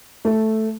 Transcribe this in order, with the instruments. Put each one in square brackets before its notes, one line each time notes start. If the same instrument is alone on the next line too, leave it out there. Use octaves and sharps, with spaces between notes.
[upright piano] A3